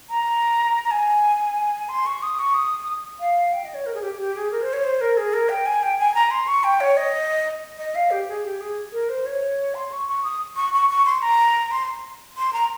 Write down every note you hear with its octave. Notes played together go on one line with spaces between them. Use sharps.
A#5
A#5
G#5
C6
C#6
D#6
C#6
D#6
F5
G5
D#5
C#5
A#4
G#4
G4
G4
G#4
A#4
C5
C#5
C5
A#4
G#4
A#4
G5
G#5
G5
G#5
A#5
C6
C#6
G5
C#5
D#5
D#5
F5
G4
G#4
G4
G#4
A#4
C5
C#5
C6
C#6
C#6
D#6
C#6
C#6
C#6
C6
A#5
C6
C6
A#5